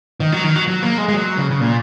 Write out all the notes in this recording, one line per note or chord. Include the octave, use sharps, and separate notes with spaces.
D#3
F#3
D#3
F#3
F#3
A#3
G#3
G#3
F#3
C#3
C#3
A#2